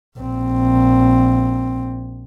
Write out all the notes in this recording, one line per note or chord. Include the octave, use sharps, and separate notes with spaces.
A#1 C4